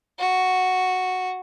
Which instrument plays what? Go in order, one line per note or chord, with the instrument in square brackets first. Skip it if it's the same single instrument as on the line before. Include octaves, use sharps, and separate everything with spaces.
[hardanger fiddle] F#4